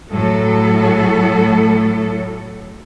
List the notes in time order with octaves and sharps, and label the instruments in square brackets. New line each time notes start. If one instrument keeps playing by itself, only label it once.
[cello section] A2 F#3 A4